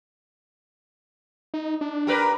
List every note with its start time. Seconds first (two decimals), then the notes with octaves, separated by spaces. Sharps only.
1.54 D#4
1.81 D4
2.07 G4 A#4 B4